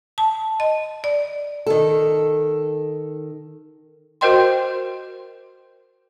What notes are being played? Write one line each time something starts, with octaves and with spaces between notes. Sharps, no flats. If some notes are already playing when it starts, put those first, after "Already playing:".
A5
D#5
D5
D#3 A4
F#4 A#4 C5 D#5 G5 C6